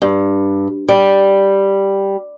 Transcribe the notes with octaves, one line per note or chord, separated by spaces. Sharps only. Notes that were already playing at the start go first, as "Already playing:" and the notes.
G2
G3